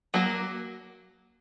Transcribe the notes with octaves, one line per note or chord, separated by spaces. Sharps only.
F#3 A#3